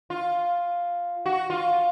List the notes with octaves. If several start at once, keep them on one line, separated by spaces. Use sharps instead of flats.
F4
F#4
F4